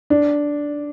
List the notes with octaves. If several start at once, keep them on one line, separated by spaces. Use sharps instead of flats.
D4